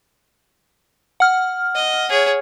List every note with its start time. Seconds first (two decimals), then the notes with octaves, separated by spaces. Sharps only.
1.20 F#5 F6
1.75 D#5
2.09 G#4 C#5